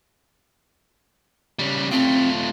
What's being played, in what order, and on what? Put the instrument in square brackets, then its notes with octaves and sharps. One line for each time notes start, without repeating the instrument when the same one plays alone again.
[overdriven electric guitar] C#3 G3
[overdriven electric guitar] A3 F4 [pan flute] C4